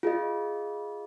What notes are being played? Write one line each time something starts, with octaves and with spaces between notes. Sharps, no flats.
F4 G#4 D#5